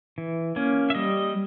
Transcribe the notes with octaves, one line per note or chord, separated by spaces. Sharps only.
E3
A#3 C#4
E5
G3 D#5